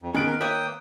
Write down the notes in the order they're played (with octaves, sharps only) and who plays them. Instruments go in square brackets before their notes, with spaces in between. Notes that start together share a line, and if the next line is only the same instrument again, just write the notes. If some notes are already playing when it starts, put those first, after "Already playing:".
[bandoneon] F2
[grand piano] D#3 F#6 D7 [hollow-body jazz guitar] B3 C#4 [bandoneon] G#4
[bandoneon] A#4
[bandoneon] A#3 G5 D#6 [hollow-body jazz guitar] B4 C#5 E5